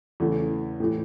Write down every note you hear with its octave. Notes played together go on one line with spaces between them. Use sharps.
E2 C#3 E3 A3
A2 E3